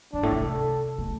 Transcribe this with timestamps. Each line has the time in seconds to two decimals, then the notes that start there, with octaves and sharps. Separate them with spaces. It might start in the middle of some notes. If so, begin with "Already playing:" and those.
0.13 G2 D4
0.23 A2
0.32 C3
0.42 A4
0.99 A3